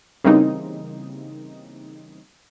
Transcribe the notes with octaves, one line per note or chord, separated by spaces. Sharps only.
C#3 E3 G3 A#3 C4 D#4